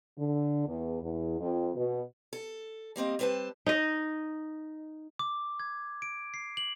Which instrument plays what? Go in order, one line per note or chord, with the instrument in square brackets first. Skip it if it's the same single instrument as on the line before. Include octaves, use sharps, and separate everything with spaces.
[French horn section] D3
E2
E2
F2
B2
[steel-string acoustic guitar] A4
G3 A#3 C4 D#5
G3 C4 B4 C5 A5
[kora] D#4 D#5
[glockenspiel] D6
G#6
D7
C7
F#7